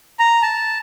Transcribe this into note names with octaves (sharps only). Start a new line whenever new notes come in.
A#5
A5